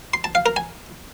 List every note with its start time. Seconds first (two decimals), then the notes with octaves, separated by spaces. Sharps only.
0.14 C6
0.24 A5
0.35 F5
0.46 A#4
0.56 G#5